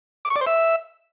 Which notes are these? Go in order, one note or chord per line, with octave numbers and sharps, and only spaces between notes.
D6
C#6
D5
C5
E5